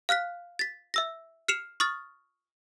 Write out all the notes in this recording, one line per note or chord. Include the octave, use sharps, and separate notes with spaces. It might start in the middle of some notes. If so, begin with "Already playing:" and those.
F5 F6 F#6 B6
A6 B6
E5 E6 A#6
F6 C7 C#7 E7 F7
C#6 D#6 F6 A6